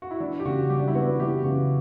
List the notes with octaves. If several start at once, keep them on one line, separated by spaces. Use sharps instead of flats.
F#4
E4
E3 D4
G4
C#3 F#4
G3 G4
D4
E4
B3 F#4
E3 G4
C#3 F#4